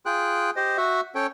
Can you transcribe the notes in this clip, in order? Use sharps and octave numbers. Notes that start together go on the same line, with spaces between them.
F4 G#4 G5 F#6
G4 C5 D#5
F#4 E5 F#5
C#4 A4 C#5 G5